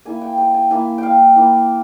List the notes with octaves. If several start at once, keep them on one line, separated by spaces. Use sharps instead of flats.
A#3 E4 G#5
G5
G5
G#5
A#3 E4 G#5
F5 G5
A#3 E4